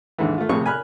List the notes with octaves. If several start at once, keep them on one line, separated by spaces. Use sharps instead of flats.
D#2 G#2 D3 E3
A3 F4
A#1 A2 C3 G#4 C#6
G#5 B5 F6 F#6